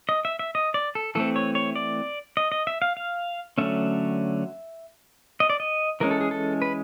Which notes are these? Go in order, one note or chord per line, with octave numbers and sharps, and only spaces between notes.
D#5
E5
E5
D#5
D5
A4
E3 A3 C4 A4
C#5
C#5
D5
D#5
D#5
E5
F5
F5
D3 F#3 A3 C#4 E5
D#5
D5
D#5
E3 G#3 C#4 A#4
A4
G#4
A4
B4